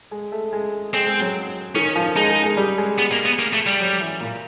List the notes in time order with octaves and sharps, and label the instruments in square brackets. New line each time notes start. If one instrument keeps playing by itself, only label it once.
[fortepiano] G#3
A3
G#3
[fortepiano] G#3 [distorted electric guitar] C4
[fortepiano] G#3
F#3
[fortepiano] D#3 [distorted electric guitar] C#4
[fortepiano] F3
[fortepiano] G#3 [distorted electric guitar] D#4
[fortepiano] G#3
G#3
G3
G#3
[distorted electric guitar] B3
A#3
B3
A#3
A3
G3
[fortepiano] F#3
E3
A#2